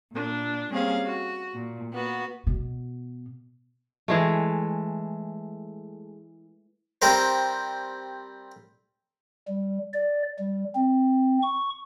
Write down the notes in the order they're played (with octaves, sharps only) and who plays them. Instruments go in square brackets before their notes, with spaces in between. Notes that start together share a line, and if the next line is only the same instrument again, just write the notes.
[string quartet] A#2 D4
G3 A#3 C4 C#4 G#4 F5
F#4
A#2
A#3 B3 F#4
[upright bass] B2
[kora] E3 G#3 A3
[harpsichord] G3 C4 A#4 C5
[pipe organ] G3
D5
G3
C4
C#6